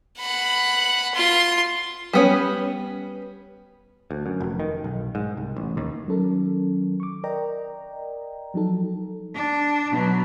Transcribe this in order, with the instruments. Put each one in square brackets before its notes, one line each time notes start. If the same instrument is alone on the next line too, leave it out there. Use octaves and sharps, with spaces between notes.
[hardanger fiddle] F#5 B5
F4 C6
[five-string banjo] G3 B3 C#4
[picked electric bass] D2
F#2
F1
D#3
B1
G#2
C2
A1
D#2
[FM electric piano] D#3 F#3 C#4 A4 A#4
C#6 D6
A#4 D5 D#5 G5 A#5
F3 F#3 D#4 A4
[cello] D4
B2 F#3